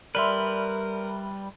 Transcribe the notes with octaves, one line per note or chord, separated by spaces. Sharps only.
G3 A#4 B4 D5 E5 B5 C6 F6